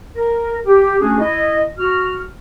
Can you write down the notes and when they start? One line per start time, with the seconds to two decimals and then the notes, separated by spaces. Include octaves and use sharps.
0.15 A#4
0.65 G4
1.01 A3 C#4 D4 F#4 G#4
1.20 E4 D#5
1.78 F#4 F6